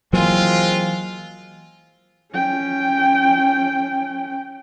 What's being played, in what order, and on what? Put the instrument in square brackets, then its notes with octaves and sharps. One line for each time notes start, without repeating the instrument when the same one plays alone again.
[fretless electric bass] E3 F#3 A#3 [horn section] G#3 C4 F4
[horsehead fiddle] C#4 G5